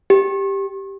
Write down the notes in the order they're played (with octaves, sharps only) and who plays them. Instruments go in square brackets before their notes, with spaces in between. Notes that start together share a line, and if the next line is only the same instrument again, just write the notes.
[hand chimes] G4